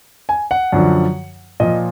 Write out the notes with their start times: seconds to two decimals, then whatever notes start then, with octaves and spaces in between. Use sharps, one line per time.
0.29 G#5
0.51 F#5
0.73 F#2 D3 F3
1.60 A#2 F3 D#5